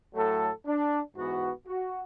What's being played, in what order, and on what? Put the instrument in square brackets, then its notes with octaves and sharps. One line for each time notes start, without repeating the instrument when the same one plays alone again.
[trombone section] A2 F#3 A3 A4
D4
G#2 E3 B3 F#4
F#4